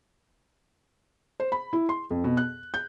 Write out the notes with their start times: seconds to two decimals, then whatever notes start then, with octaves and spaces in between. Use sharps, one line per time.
1.40 C5
1.52 B5
1.73 E4
1.89 C6
2.10 F2
2.24 B2
2.37 F#6
2.74 G6